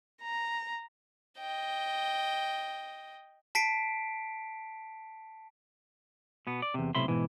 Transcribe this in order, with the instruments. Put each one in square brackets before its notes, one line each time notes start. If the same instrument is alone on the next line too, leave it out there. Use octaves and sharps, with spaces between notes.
[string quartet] A#5
[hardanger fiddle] D#5 G5
[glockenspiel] A5 B6 C7 D7
[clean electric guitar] B2 B3
D5
E2 C3
B1 A2 C3 E5 B5 C6
G#2 B2 E3